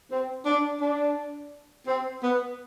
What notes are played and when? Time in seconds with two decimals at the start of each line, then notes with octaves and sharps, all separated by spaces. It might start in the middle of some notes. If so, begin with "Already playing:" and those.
0.10 C4
0.46 D4
0.82 D4
1.88 C4
2.23 B3